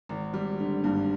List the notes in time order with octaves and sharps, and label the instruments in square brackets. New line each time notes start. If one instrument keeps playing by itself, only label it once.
[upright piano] G#1
G3
D3
G2